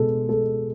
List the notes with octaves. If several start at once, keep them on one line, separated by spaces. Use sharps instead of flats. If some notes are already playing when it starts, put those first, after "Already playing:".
Already playing: B2 G#3 A4
G#3 A4